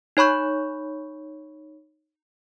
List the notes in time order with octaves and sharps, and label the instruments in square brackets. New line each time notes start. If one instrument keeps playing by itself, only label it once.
[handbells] D#4 C#5 B5 C#6 G6